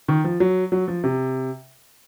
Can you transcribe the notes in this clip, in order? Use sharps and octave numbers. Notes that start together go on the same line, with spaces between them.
D#3
F3
F#3
F#3
F3
C3